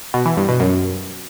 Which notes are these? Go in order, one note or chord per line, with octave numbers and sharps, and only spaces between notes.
B2
E3
G2
B2
F#2